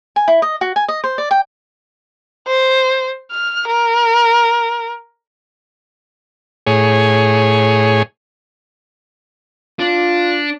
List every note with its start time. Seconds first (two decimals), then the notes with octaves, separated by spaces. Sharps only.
0.16 G#5
0.28 E4
0.42 D#5
0.61 F#4
0.76 G#5
0.88 D#5
1.04 C5
1.18 D5
1.31 G5
2.47 C5
3.31 F6
3.67 A#4
6.67 A2 G#4 C#5
9.79 D4 F4